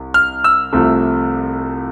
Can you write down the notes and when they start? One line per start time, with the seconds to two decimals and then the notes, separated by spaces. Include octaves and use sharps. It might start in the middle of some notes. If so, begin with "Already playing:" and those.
Already playing: C2
0.14 F6
0.44 E6
0.73 C2 C3 F3 A3